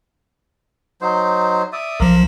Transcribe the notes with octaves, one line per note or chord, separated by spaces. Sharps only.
F#3 D#4 C5
D5 E5 D#6
B1 F3 A#4 F5